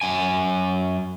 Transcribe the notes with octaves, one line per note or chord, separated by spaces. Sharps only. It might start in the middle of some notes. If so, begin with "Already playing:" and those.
F#2 G#5